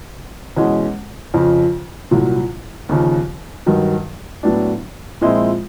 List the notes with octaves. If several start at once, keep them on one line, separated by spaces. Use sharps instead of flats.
E2 B2 G#3 C#4
F2 C#3 F3
C2 A#2 F#3
D#2 C#3 F3
G2 D#3 F#3
A2 F#3 B3 D4
A#2 F3 G#3 C4 E4